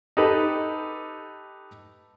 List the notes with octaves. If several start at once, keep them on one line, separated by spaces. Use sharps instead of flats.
D#4 G4 A4 B4